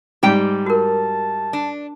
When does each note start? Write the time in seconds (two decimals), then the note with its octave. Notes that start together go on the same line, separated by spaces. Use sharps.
0.23 G#2 G3 G4 G5
0.66 F#4 A#4 A5
1.53 D4